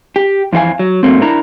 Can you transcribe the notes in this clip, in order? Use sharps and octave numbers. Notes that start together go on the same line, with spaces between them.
G4
F2 E3 F#4 F5 G#5
F#3
G#2 F#3 A3 A#3 C4
D4 E4 A#4 A#5